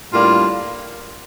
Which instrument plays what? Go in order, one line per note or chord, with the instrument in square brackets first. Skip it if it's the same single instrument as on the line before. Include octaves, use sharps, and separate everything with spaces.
[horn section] A2 G3 A#3 D4 F4